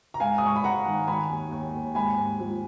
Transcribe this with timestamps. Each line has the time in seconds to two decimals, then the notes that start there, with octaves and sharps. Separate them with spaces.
0.14 A#5
0.20 G#2 F5 G#5
0.38 D#6
0.42 G#2 C#6
0.56 B5
0.64 G#2 F#5 A#5
0.86 D#3
1.07 D#3 G#5 B5
1.30 D#2
1.51 D#2
1.74 D#2
1.95 G#2 G#5 B5
2.17 G#2
2.40 F3